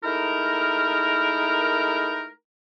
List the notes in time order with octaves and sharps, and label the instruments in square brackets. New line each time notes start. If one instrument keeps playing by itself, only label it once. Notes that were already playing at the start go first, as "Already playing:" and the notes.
[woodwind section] G#3 A3 D#4 E4 A#4